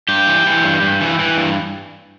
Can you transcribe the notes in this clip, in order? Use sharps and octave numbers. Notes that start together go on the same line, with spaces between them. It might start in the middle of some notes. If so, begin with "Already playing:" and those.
G2 G4
E3
E3
G2
G2
E3
E3
G2